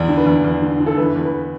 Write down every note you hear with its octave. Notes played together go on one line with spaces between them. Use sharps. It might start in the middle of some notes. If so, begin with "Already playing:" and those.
Already playing: E2 D5
D3
B4
E2
E2
D3
D3
A4
E3 B4
E2
B4